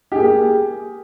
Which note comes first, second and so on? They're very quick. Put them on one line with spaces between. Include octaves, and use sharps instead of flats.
G4 G#4 A#3